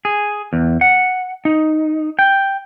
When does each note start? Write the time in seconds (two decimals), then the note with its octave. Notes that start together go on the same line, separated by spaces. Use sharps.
0.05 G#4
0.53 E2
0.81 F#5
1.45 D#4
2.19 G5